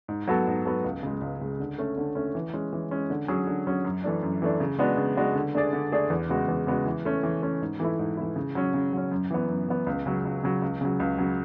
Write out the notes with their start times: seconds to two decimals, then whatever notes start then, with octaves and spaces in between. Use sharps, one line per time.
0.08 G#2
0.28 F#3 B3 F#4 A4
0.47 G#2
0.65 F#3 B3 F#4 A4
0.84 C#2
1.03 C#3 G#3
1.21 C#2
1.41 C#3 G#3
1.60 D3
1.78 A3 C#4
1.97 D3
2.15 A3 C#4
2.35 E3
2.53 G#3 C#4
2.73 E3
2.91 G#3 C#4
3.10 D3
3.28 F#3 C#4 G#4
3.47 D3
3.66 F#3 C#4 G#4
3.85 F#2
4.04 E3 A3 D4
4.23 F#2
4.42 E3 A3 D4
4.60 C#3
4.79 G#3 B3 D4 F#4
4.97 C#3
5.17 G#3 B3 D4 F#4
5.36 D3
5.55 A3 D4 G#4 D5
5.73 D3
5.92 A3 D4 G#4 D5
6.10 E2
6.29 C#3 G#3 B3 F#4
6.48 E2
6.67 C#3 G#3 B3 F#4
6.85 E3
7.05 A3 C#4
7.23 E3
7.42 A3 C#4
7.61 G#2
7.80 E3 A3 E4
7.99 G#2
8.17 E3 A3 E4
8.36 C#3
8.55 F#3 C#4
8.74 C#3
8.93 F#3 C#4
9.11 F#2
9.31 E3 B3
9.49 F#2
9.69 E3 B3
9.86 C#2
10.06 C#3 F#3
10.25 C#2
10.43 C#3 F#3
10.62 C#2
10.81 C#3 F#3
11.00 C#2
11.18 C#3 F#3